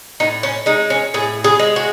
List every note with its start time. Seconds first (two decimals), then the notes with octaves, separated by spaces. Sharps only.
0.20 A2 D#4
0.43 C#4
0.66 G#3 D#4
0.90 C#4
1.14 A2 G#4
1.44 G#4
1.59 G#3
1.76 F#4